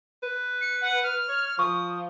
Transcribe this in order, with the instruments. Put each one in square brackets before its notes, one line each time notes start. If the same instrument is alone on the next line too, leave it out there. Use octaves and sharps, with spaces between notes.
[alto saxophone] B4
[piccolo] C#7
F#5
F6
[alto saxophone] C#5
[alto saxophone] F3 [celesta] C#6 [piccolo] D#6